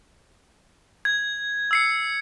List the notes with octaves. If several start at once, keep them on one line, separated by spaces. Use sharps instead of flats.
G#6
E6 C7 C#7